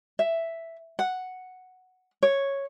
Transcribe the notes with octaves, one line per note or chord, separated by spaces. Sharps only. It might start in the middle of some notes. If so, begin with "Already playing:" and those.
E5
F#5
C#5